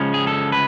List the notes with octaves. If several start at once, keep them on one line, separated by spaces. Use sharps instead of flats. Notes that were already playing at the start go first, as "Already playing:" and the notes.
Already playing: C#3 F3 G#3 C#4
G#4
A4
B4